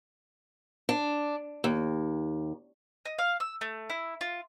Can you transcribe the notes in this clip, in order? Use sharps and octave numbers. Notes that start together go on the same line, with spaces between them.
D4
D#2
D#5
F5
E6
A3
E4
F4